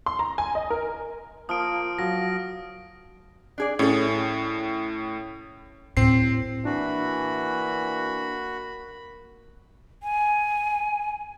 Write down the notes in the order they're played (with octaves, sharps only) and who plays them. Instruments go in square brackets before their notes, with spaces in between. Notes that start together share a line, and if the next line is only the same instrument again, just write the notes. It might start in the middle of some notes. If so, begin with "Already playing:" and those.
[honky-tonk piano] C6
A#5
G#5
D#5
A#4
[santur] F3 [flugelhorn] A#3 [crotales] D#6 F6 D7
[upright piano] F#3 [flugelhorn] F5 [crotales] A#6
[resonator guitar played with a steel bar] D4 G#4 D5
[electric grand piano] A2 [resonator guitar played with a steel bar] C#4 G#4 A4
[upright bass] D#2 A2 [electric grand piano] C4 C7
[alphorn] E3 [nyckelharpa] A#3 B5 [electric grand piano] D4 [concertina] F#4
[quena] G#5